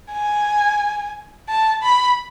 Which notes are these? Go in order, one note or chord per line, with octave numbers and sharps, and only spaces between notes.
G#5
A5
B5